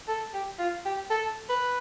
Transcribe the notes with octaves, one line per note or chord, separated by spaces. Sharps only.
A4
G4
F4
G4
A4
B4